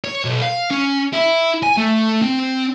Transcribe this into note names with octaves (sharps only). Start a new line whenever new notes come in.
C#5
B1
F5
C#4
E4
G#5
A3
C4